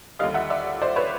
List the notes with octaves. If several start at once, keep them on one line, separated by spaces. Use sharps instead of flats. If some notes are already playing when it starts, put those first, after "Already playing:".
D#2 D3 G3 D#5 F5
E5 F#5
D5 E5
C5 D5
B4 C#5